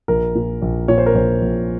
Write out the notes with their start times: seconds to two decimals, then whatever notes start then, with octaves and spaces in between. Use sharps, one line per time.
0.08 A#1 A#4
0.35 A#2
0.62 A#1
0.88 A#2 C#5
0.98 C5
1.06 A#4
1.14 A#1 C5
1.41 A#1